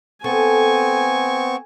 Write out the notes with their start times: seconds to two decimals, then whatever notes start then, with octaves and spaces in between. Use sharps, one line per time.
0.24 B3 C4 A4 G#5 C#6